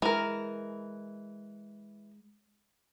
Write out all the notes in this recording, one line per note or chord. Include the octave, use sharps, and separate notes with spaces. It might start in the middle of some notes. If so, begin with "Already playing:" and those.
E3 G#3 A#4